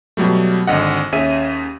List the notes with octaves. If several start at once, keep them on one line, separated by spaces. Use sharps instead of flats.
B2 F#3 G3 A3
G#1 D3 D#5 F#5
D#2 C#4 G#4 E5 D#7